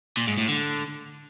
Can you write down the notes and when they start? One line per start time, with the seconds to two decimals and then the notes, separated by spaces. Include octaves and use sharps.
0.17 A#2
0.27 G#2
0.38 A2
0.48 D3